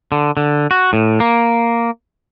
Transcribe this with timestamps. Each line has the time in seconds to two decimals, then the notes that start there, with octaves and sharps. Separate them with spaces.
0.12 D3
0.37 D3
0.71 F#4
0.93 A2
1.20 A#3